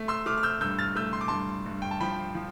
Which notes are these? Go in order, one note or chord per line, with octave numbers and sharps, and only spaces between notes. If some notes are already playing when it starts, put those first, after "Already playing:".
Already playing: A3
C6 E6
A3 D6 F6
F6
E6 G6
G2 E6 G6
F6 A6
A3 E6 G6
C6
D6
G2 A5 C6
G2
G5
A5
F3 G5 B5
F3